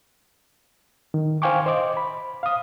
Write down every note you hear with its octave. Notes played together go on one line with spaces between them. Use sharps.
D#3
C5 F5 G5 G#5 C#6 D6
C5 D#5 D6
B5
F5 D#6